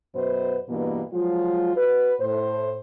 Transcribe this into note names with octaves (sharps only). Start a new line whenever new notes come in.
F#2 B2 B4 C5
G2 B2 E3 A#3
F3 F#3 G#3 F4
F#4 B4
A2 C5